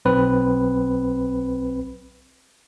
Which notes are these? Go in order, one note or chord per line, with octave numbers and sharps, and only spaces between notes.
B1 C4 B4